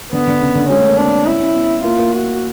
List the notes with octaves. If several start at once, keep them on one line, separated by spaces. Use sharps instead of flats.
D3 B3
D3
C#3
D3
G#3 C#4
A3
A#3
C4 D4
C#4 E4
C#4
B3
A#3 F4
A#3
F#4